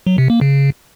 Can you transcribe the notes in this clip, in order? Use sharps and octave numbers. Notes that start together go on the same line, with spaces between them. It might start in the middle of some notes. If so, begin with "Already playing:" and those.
F#3
C3
A#3
C#3